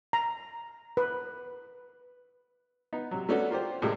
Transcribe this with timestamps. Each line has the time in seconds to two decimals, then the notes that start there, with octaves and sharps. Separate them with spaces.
0.13 A#5
0.97 B4
2.93 B3 D#4
3.11 C3 F#3
3.29 A3 B3 C#4 D4 F#4 A4
3.51 A#3 F4 G4 C5
3.82 A2 C3 G3 G#3 A#3 C4